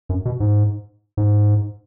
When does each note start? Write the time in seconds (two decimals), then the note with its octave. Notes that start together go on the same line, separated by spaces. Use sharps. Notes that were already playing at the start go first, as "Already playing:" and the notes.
0.09 F#2
0.25 B2
0.40 G#2
1.17 G#2